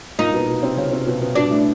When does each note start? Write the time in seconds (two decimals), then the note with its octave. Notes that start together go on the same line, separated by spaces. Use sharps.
0.19 A#2 A#3 D#4
0.34 B2 B3
0.48 B2 B3
0.63 C3 C4
0.77 C#3 C#4
0.92 C3 C4
1.07 B2 B3
1.21 B2 B3
1.35 B2 B3 D4
1.50 A2 A3